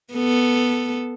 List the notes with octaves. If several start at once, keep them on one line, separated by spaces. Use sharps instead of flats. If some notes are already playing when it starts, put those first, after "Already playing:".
B3 A4